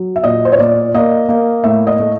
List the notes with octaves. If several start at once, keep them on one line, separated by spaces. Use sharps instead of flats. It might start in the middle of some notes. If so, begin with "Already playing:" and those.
Already playing: F#3
E5
A#2 D#5
C5
C#5
A#2 D5
A#3 D#5
A#3
A2 E5
D#5
A3